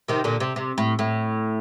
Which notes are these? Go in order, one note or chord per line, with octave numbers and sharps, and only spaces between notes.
C3 D#3
A#2 D3
C3
C3
A2
A2